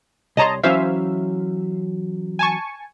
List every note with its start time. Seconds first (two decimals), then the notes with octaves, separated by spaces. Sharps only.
0.37 C2 C#5 D#5 A5 A#5 C6
0.63 E3 F#3 C#4 C5 E5 F5
2.39 G#5 A5 C#6